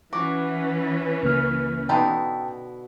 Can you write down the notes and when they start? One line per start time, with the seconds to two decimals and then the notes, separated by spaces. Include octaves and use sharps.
0.13 E3 C#4 F#4 B4 D6
1.23 C#2 A#3 F6
1.89 B2 D3 D#4 E4 G5 A5